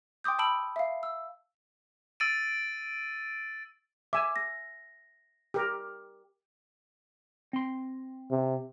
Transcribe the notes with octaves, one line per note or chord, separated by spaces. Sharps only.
G5 C6 D6 D#6 G6
A5 B5 E6 D7 F#7
E5 F5
E6
E6 A6 D7 D#7
E5 G#5 D6
A#6
G4 A#4
C4 C6
C3